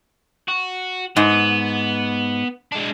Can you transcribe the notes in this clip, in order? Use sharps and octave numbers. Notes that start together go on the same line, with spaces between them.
F#4
G#2 B3
G#3 D4